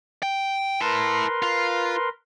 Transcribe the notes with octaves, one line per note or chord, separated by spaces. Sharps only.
G5
E4 A#4 B4 A5 C6
F4